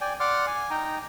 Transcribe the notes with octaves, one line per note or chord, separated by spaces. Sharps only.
D5 G5 G#5
D5 F#5 C6 D6 F6
G#5
D#4 G5 A#5